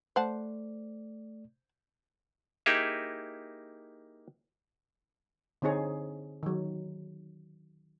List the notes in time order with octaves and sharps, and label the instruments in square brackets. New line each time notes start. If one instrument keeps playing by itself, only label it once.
[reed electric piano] A3 D5 [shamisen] C5 F#5 A5
[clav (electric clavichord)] A#3 D#4 E4 G4 G#4 E5
[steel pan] D3 C4 D#4 G#4 C#5
D#3 F#3